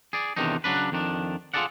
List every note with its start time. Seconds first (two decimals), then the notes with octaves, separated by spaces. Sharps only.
0.13 G#4 D5
0.37 E2 C3 D#3 D4 D#4
0.64 C#3 F#3 D4 B4
0.92 F2 D#3 D4
1.54 F4 F#4 G#4 A4 D5 F#5